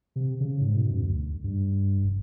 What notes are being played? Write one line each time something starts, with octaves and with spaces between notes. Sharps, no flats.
C3
C#3
G#2
B2
F#2
D2
G2
F1